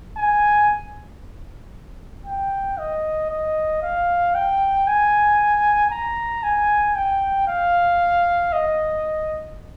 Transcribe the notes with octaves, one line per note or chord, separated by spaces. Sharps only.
G#5
G5
D#5
D#5
F5
G5
G#5
A#5
G#5
G5
F5
D#5